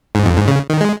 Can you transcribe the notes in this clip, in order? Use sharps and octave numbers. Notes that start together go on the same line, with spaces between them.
G#2
F2
G#2
C#3
D#3
G#3